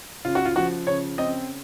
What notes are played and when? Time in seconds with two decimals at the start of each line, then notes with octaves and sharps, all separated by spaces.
0.25 C#3 F4
0.35 F#4
0.45 F4
0.56 F3 F#4
0.87 C#3 C#5
1.18 C4 D#5